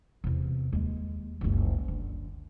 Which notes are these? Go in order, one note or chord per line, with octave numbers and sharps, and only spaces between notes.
E2 C3
D#2 G#3
F#1 C#2
D3